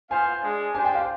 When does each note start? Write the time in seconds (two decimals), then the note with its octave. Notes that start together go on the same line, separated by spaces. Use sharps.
0.10 B3 F4 C5 F5 G#5
0.42 G#3 D4 G#4
0.74 D4 G4 C5 G#5
0.85 G5
0.95 F5